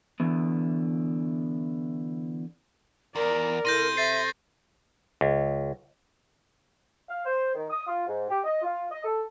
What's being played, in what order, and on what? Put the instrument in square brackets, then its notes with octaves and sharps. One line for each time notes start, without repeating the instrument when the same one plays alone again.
[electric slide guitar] D3 E3 B3
[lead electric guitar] E2 [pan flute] A#4 [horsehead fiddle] D5 A#5
[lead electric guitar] C3 [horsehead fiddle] E4 A4 [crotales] G6 A#6 D#7
[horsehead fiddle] A4 C5 [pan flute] E5 [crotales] A6 C7
[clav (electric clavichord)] C#2
[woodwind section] F5
C5
D#3
D#6
F4
G#2
G4
D#5
F4
D#5
A4